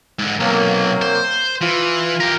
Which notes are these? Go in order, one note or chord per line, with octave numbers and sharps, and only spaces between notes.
G#2 D3
B1 C3 F#3 A#3
C5
E3 F4
G4 A#4